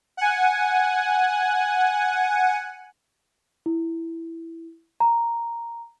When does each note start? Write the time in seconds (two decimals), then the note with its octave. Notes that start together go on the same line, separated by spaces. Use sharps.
0.17 F#5 G#5
3.66 E4
5.00 A#5